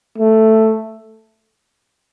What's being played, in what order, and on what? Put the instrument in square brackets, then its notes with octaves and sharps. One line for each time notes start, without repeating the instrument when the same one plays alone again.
[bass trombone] A3